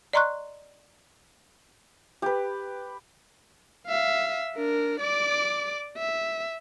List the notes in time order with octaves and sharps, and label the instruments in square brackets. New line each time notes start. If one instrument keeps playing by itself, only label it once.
[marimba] D5 D#5 A#5 C6 C#6 F#6
[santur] G4 B4
[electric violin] E5 F5
D4 A#4
D5 D6
E5